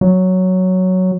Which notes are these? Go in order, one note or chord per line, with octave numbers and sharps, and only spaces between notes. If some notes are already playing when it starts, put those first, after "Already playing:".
F#3